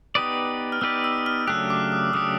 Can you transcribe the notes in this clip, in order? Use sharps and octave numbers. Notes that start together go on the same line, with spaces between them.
B3 D#4 G4 B4 D5 D#6
F6
B3 D#4 G4 B4 D5 E6
E6
F6
C#3 F#3 A3 D4 G4 F#6
D6
D#6
C#3 F#3 A3 D4 G4 D#6